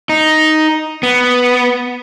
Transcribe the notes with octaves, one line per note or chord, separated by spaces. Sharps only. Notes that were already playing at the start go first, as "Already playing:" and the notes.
D#4
B3